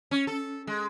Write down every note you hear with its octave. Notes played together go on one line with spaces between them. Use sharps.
C#4
A4
G#3